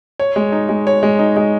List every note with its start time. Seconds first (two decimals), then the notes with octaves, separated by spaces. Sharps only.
0.20 C#5
0.36 G#3
0.52 D#4
0.69 G#3
0.87 C#5
1.03 G#3
1.19 D#4
1.37 G#3